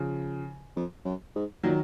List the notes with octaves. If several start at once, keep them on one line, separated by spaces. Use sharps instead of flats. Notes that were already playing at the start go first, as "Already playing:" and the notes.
Already playing: C#3 F3
F2
F#2
G#2
A#2 D#3 F#3